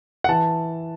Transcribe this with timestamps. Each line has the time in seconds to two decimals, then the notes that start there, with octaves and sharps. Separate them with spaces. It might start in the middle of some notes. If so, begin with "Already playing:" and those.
0.24 F#5
0.29 E3 A5